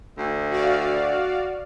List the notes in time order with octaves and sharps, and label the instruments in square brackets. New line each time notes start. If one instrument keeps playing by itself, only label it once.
[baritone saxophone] D2
[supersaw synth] F#4 D5 F5